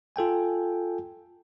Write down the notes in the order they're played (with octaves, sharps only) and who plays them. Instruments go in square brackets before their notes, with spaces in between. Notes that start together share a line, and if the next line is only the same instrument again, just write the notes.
[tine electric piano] F4 A4 G5 G#5